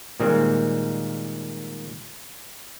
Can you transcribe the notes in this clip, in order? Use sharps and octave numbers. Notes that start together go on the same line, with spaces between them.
A#2 D#3 G3 G#3 A#3 C4